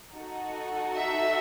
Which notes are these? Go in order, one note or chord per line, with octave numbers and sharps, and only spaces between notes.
D#4 F#4 A4
E5